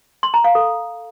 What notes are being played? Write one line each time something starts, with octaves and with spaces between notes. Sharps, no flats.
C6
A#5
F5
A4